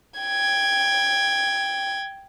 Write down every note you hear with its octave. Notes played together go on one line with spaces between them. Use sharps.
G5 G#6